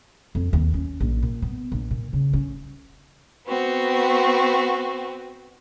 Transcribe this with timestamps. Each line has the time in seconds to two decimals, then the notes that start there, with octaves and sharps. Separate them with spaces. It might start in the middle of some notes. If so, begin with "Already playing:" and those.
0.35 F2
0.53 D#2
0.74 C#4
1.00 A#1
1.22 A#2
1.42 B3
1.72 A#1
1.91 A#2
2.13 C#3
2.33 C#4
3.46 B3 C4 F#4